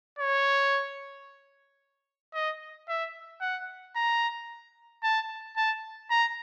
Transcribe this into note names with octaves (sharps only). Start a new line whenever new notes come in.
C#5
D#5
E5
F#5
A#5
A5
A5
A#5